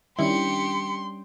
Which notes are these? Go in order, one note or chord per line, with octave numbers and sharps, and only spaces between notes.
D#3 G3 C#4 D4 E4 G4 C6 C#7